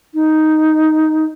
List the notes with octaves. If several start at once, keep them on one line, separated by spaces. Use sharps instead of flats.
D#4